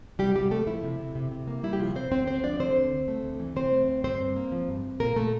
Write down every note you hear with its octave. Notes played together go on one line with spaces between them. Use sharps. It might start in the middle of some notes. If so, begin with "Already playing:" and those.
C3 G3 G4
C3 G3 G4
A3 A#3 A4
F3 E4
C3
C3
C3
C3
A#3
G3 E4
G4
C3 F3 F4
C3 C4 C5
D2 C4 C5
D2 C4 C5
F3 D4 D5
D3 C4 C5
D2
D2
A3
D2
E3
C3 C4 C5
A3
D2
G2 C4 C5
G2
A#3
F3
G2
G2
A#2 A#3 A#4
A#2 A3 A4